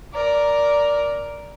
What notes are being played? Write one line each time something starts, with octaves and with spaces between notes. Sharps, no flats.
A#4 D5